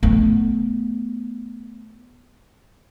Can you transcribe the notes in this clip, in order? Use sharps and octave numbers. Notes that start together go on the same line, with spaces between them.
A3 B3